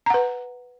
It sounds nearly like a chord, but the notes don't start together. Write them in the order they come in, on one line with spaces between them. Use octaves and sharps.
A#5 F#5 B4